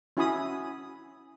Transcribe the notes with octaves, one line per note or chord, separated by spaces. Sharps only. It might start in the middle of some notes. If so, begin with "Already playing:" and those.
C#4 E4 F#4 G#5 B5 D#6